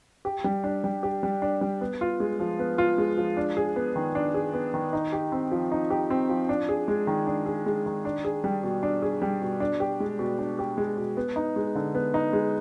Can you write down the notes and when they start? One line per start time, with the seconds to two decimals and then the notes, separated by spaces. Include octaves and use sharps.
0.25 G4
0.44 G3
0.64 D4
0.84 G3
1.03 G4
1.23 G3
1.42 D4
1.61 G3
1.81 B3
2.01 F4
2.20 G#3
2.40 F3
2.59 B3
2.78 F4
2.98 G#3
3.18 F3
3.37 D4
3.57 G#4
3.76 B3
3.96 D#3
4.15 D4
4.34 G#4
4.54 B3
4.74 D#3
4.93 D#4
5.13 G4
5.32 C4
5.52 F3
5.72 D#4
5.90 G4
6.10 C4
6.29 F3
6.49 D4
6.69 G#4
6.88 G#3
7.07 D#3
7.27 D4
7.46 G#4
7.66 G#3
7.86 D#3
8.05 D4
8.25 G#4
8.44 G3
8.63 B2
8.83 D4
9.02 G#4
9.22 G3
9.41 B2
9.60 D4
9.80 G4
10.00 G#3
10.19 B2
10.39 D4
10.59 G4
10.78 G#3
10.97 B2
11.17 B3
11.36 D#4
11.56 G#3
11.75 D3
11.95 B3
12.14 D#4
12.33 G#3